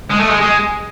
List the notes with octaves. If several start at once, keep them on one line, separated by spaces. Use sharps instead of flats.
G#3
A3
G#3
G#3